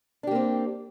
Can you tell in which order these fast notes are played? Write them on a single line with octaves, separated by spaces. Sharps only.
D4 G4 A#3 C4